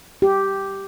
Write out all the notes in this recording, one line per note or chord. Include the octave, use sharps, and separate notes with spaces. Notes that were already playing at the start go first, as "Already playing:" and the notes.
G4